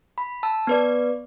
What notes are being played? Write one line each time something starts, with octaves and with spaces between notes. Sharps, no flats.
B5
A5 E6
B3 B4 D5